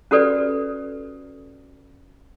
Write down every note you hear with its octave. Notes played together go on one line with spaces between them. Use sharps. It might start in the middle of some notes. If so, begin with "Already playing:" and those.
C#4 F#4 G4 A4 B4 D5